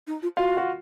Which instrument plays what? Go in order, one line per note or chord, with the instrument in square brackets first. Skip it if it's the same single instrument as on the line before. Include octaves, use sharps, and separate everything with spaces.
[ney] D#4
F4
[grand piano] F4 F5 [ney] F#4
[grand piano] F#4